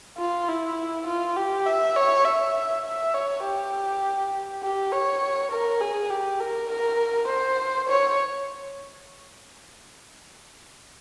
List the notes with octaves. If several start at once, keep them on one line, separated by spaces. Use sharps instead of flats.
F4
E4
F4
G4
E5
C#5
E5
E5
C#5
G4
G4
C#5
A#4
G#4
G4
A#4
A#4
C5
C#5